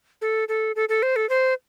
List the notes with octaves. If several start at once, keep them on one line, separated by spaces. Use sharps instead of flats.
A4
A4
A4
A4
C5
A4
C5